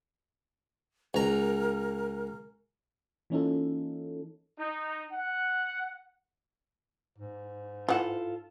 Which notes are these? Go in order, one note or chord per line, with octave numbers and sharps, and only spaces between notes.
C#2 A#4 A#5
E3 A#3 C#4 D#4 F4 A4
D#4
F#5
G#2
E3 F4 A4 F#5